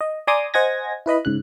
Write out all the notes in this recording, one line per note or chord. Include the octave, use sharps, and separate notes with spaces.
D#5
D5 G#5 A#5 C6 D6 D#6
C5 D#5 F#5 G#5 G#6 A#6
E4 B4 D#5 B5
G#2 C#3 F#6